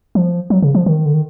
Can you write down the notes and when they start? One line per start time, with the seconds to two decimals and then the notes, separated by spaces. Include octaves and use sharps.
0.15 F3
0.50 F#3
0.62 C#3
0.75 F3
0.86 D#3
1.06 D3
1.14 D#3